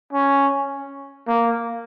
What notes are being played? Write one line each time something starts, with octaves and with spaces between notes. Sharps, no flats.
C#4
A#3